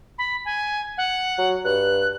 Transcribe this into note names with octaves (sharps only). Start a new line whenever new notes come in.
B5
G#5
F#5
F#3
G2 F#6